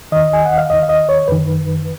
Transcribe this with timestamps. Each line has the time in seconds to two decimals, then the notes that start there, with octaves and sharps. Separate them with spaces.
0.12 D#2 D#3 D#5
0.33 G#5
0.46 F#5
0.58 F5
0.70 D#2 D#3 D#5
0.83 F5
0.89 D#5
1.09 C#5
1.28 F#2 D#3 B4